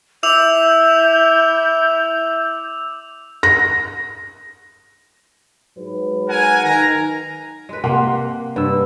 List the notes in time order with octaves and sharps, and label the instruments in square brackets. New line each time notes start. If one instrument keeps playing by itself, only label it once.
[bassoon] E4 [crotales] D6 E6 F7 [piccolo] G6
[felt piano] A#6
[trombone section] G#2 F#3 B4
[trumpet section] A#4 F#5 G#5
[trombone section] D#3 [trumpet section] A#4 A#5
[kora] G#3 B4
[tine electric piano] C3 [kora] A#3 G4 [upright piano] F#5 C6
[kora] G2 [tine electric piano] B4 E6